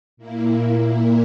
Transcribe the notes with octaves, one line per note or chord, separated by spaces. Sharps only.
A#2 A#3 E4
A#4